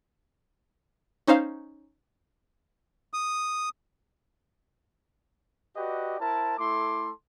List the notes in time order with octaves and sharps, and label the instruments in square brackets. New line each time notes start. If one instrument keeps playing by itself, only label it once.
[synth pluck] C#4 D#4 C5 F5
[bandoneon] D#6
[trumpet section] F#4 G4 B4 D5 D#5
E4 A#4 C5 A5
A3 E4 A4 C6 D6